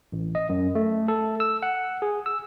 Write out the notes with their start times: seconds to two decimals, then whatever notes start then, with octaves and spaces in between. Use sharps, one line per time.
0.12 A1
0.35 D#5
0.49 F#2
0.75 A3
1.08 A4
1.40 E6
1.63 F#5
2.02 G#4
2.26 E6